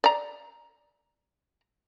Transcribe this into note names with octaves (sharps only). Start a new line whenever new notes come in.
D5 A#5